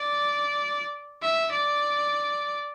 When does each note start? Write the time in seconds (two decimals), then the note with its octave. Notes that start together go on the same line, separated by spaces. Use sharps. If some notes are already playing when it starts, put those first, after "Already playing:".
Already playing: D5
1.22 E5
1.52 D5